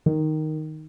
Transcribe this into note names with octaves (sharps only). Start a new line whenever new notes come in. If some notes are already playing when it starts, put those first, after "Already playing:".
D#3